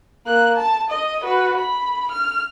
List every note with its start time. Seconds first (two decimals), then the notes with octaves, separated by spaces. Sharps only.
0.26 A#3 F#6
0.55 A5
0.90 D#5
1.24 F#4 B4
1.58 B5
2.11 F6